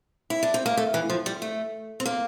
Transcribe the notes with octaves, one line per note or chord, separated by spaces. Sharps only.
E4
D4
C4
A#3
A3
E3
F3
G3
A3
C4
A#3